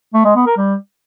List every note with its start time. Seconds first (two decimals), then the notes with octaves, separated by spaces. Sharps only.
0.14 A3
0.25 G#3
0.36 B3
0.46 A#4
0.57 G3